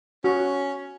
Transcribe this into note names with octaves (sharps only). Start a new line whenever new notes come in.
C#4 F#4